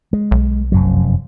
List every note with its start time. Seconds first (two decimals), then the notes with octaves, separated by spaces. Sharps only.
0.13 G#3
0.31 B1
0.72 F1 F#2 F#3